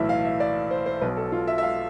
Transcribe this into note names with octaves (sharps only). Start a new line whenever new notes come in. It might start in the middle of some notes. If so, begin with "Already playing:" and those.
Already playing: B1 A2 E3 E5
F5
E5
D5
C5
C5
B1 B2 B4
A4
F4
E5
E5
F5